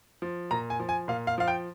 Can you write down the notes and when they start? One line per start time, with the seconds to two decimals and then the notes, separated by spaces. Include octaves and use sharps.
0.22 F3
0.51 A#2 A#5
0.70 G#5
0.80 F3
0.89 G#5
1.08 A#2 F5
1.27 F5
1.38 F3 F5
1.48 G5